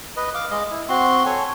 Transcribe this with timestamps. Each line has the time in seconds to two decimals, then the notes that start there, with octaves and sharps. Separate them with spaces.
0.17 B4 D#5
0.34 F5 D6
0.51 G#3 D#5
0.71 E4
0.89 C4 F#4 C6
1.26 A4 C#5 G#5